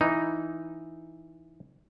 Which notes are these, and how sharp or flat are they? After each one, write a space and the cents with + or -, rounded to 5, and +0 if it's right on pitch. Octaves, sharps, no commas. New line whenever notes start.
E3 +0 D#4 +0